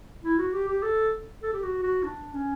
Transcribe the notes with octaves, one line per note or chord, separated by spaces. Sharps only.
E4
F#4
G4
G4
A4
A4
G4
F#4
F#4
D4
C#4